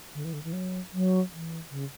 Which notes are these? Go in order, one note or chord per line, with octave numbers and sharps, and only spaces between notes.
D3
E3
D3
E3
F#3
F#3
E3
C#3